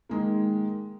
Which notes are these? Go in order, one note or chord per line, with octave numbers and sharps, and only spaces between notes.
D#3 G#3 A#3